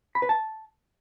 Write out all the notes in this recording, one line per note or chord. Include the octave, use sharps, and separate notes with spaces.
B5
B4
A5